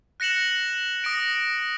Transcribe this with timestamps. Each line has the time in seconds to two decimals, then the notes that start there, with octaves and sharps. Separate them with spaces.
0.20 F#6 A#6 C#7 E7 F#7
1.04 D#6 A#6 D7